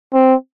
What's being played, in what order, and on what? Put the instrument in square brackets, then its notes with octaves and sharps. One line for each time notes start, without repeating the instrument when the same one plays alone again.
[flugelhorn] C4